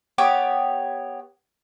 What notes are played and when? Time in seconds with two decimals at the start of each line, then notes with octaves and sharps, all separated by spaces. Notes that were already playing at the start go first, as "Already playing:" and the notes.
0.18 B3 G4 C#5 D6